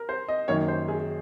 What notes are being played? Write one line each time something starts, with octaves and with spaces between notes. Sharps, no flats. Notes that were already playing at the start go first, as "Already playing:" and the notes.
Already playing: A#4
C5
D#5
F#2 D#3 A#3 D#4 C#5
C5
G#4